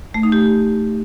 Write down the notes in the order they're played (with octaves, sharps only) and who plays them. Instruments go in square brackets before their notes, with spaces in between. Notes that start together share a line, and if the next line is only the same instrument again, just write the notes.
[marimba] A3
D#4
G4